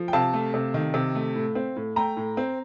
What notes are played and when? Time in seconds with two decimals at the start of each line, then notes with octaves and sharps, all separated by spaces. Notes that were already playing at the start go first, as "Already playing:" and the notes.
Already playing: F3
0.08 G5
0.13 C3 F5 A5
0.33 A3
0.54 C3
0.74 D#3
0.94 C3
1.15 A3
1.35 A2
1.55 C4
1.76 A2
1.96 A3 G5 A#5
2.17 A2
2.37 C4